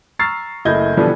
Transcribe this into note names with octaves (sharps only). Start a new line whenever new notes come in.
A#5 C#6 E6 F6 A6 C7
F#1 A3 E4 D#5 G6 G#6
B2 D3 E3 F3 G3 B3